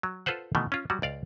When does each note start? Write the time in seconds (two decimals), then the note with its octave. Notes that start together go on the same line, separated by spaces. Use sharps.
0.03 F#3
0.26 F4 A4 B4 C5 F#5
0.55 B2 D#3 E3 A3
0.72 C#4 F4
0.90 F#3 G3 F#4
1.02 C#2 D5 F5